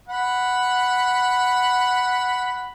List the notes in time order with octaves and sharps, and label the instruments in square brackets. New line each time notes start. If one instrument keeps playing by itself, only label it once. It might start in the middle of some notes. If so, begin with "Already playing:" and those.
[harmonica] F#5 B5